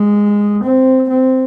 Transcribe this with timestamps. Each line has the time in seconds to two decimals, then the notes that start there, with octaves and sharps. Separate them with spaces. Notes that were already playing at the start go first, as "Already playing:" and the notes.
Already playing: G#3
0.64 C4
1.09 C4